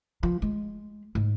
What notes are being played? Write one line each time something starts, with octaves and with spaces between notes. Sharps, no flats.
F3
G#3
G#2